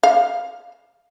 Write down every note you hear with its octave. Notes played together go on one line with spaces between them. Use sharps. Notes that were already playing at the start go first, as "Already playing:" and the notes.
F5